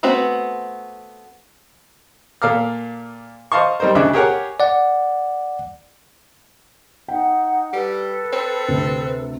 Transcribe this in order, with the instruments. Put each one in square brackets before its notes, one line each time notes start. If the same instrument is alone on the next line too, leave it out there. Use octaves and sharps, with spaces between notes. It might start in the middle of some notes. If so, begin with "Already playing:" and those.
[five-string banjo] A3 B3 C4 F#4
[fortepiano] A#2 A4 F5 A#5 D6 F6
C5 D#5 F5 A5 C6 C#6
G3 C4 D#4 A#4 C5
D2 C#3 D4 D#4 E5 D6
G4 G#4 A#4 C#5 F#5
[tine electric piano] D5 F#5
[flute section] D#4 F#5 [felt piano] G5
[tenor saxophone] G3 [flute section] A4 B4
[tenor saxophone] C4
[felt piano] D2 C3